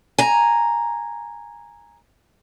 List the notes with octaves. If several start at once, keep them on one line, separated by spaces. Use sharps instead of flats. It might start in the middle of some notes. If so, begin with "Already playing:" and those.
G#5 A#5